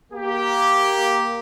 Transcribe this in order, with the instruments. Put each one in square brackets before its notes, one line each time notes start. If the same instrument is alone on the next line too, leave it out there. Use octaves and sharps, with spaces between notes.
[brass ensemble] A#3 G4